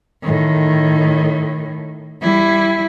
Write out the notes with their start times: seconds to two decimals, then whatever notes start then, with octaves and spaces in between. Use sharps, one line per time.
0.22 A2 D#3
2.21 G3 E4